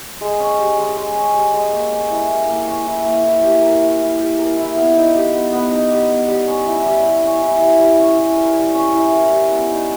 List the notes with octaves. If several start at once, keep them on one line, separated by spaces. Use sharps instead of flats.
G#3
C#4
G4
G#3
G#3
C#4
G4
G#3
A#3
C#4
E4
A#3
A#3
C#4
E4
A#3
E4
G4
A#4
E4
E4
G4
A#4
E4
B3
D#4
G4
B3
B3
D#4
G4
B3
G3
C#4
E4
G3
G3
C#4
E4
G3
G3
C#4
E4
A#4
G3
C#4
E4
A#4
G3
B3
D#4